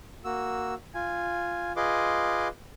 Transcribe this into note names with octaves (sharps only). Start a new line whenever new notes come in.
A#3 F#4 E6
F4 G#5
F4 G#4 B4 D#5 C6 D6